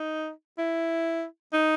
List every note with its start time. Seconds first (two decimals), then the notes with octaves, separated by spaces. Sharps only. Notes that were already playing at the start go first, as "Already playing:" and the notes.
Already playing: D#4
0.58 E4
1.53 D#4